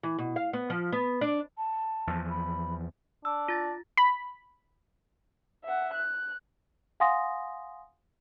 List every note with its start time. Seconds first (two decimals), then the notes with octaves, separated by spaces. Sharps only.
0.03 E3
0.18 B2
0.36 F5
0.53 B3
0.70 F3
0.92 B3
1.21 D4
1.57 A5
2.07 E2 F3
2.30 B5
3.25 D4 E6
3.48 F4 A6 A#6
3.97 B5
5.64 E5 F#5
5.94 F#6
7.00 F5 F#5 G#5 C6 D#6 A#6